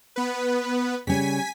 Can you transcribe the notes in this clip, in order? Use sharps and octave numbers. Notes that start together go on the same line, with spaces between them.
B3 B4
C#3 G3 C#4 G#5 B6